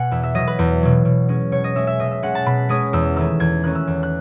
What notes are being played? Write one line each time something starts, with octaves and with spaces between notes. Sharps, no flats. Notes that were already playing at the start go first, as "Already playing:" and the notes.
Already playing: B2 F#5 G#5
E2 E5
E5
B2 F#3 D#5
B4
E2
B2 F#3
B2
G#3 C#4
B2 C#5
D#5
G#3 C#4 E5
E5
B2 D#5
E5
G#3 C#4 F#5
A5
B2 B5
G#3 C#4 D#6
E2 E6
D#3 A3 C#4 E6
E2 G#6
D#3 A3 C#4 F#6
E6
E2
F#6